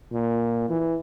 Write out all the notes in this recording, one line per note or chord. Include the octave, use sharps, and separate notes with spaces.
A#2
E3